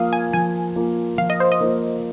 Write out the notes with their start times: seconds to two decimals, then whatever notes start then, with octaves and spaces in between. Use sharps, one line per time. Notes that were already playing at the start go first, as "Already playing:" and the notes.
Already playing: F3 A#3 F4 F5 D#6
0.13 G#5
0.33 F3 G#5
0.76 A#3 F4
1.18 F3 F5
1.30 D#5
1.40 C5
1.52 D#5
1.61 A#3 F4